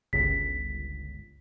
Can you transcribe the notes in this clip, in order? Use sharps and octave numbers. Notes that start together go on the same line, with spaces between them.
G1 C#2 B6